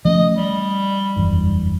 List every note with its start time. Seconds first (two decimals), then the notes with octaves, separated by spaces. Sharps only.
0.05 F3 A3 C#4 D#5
0.36 G3
1.16 F#1 E2 G2